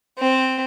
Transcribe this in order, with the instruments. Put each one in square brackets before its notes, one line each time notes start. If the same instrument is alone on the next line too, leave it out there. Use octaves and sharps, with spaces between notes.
[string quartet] C4